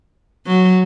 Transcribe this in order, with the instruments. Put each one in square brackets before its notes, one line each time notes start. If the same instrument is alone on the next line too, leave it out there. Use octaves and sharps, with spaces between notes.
[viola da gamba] F#3